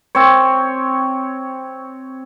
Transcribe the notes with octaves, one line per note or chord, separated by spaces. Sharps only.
C4 C#5